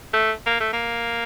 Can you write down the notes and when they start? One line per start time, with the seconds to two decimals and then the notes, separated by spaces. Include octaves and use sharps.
0.14 A3
0.47 A#3
0.60 A3
0.73 A#3